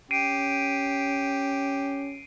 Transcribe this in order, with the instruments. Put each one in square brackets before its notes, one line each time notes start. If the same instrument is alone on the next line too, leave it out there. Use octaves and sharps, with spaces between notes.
[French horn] C#4 [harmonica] G4 [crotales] C7 D7 D#7